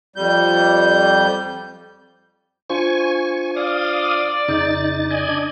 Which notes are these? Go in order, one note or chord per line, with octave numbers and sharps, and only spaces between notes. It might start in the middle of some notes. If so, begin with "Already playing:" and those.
F2 G3 G6
D4 F4 C5 G#5 C#6
D5 F5 D#6
F2 C#3 D#4 A6
D5 D#5 G#5
D4